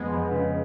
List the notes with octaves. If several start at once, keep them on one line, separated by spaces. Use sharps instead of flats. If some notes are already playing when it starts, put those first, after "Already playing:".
Already playing: F2 G#3 B3
F2
C#3